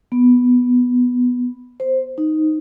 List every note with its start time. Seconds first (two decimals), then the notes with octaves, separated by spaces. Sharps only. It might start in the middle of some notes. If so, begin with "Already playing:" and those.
0.12 B3
1.80 C5
2.18 D#4